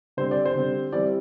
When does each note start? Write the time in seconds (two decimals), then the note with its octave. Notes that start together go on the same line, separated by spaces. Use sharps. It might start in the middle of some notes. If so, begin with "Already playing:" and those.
0.17 D3 G3 C4 C5
0.31 D5
0.45 C5
0.55 D3 G3 C4
0.93 E3 G3 C4 E4 D5